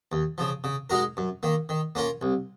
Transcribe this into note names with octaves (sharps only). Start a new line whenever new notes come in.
D#2
C#3 F3
C#3
G#3 D#4 F#4 A#4
F#2
D#3 A#3
D#3
A#3 C#4 F4 A#4
C2